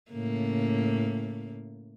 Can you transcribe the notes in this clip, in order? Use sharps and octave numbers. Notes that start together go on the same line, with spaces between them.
A2 C#3 A#3